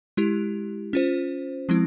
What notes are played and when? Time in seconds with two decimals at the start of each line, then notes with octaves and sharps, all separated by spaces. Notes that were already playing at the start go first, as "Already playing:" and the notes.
0.17 G#3 E4 G4
0.93 C#4 F4 C5
1.69 F3 G#3 C4 E4